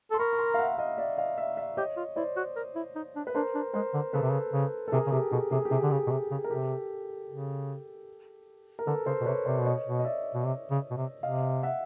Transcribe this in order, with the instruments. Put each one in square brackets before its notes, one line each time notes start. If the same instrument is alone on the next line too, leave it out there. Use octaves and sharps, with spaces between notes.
[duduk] A4 [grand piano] C6
[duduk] A#4 [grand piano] B5 C#6
[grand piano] C#6
A#5 C6
F5
E5 F#5
F#5
D#5 F5
D5 E5
D#5 F5
D5 E5
D5 E5
[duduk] G4 [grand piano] C#5 D#5
[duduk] F4
[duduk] E4 [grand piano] C5 D5
[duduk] F#4
A#4
E4
D#4
D4
[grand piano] B4
[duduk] D4 [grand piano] A#4 C5
[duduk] D4
[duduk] G#3 [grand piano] A#4 C5
[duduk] D3
[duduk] C#3 [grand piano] A4 B4
[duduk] C3
C#3
C#3
[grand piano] A4
[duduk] C3 [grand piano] G#4 A#4
[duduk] C#3
[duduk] C3 [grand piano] G4 A4
[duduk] B2 [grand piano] G#4
[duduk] C3 [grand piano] G#4
[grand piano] G4
[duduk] C3 [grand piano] G#4
[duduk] D3
C#3
B2
C3
C#3
[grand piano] A#4
[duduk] C3 [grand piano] G4 A4
[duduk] C#3
[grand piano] A#4
[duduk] D3 [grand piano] A4 B4
[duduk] C#3 [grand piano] A#4 C5
[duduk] B2
[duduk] C3 [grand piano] B4 C#5
[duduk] C3 [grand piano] C5 D5
[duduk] B2
[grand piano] C#5 D#5
[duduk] B2
[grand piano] D#5
D5 E5
[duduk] B2
C3
C#3
B2
C3
[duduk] C3 [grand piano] D#5 F5
[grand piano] E5 F#5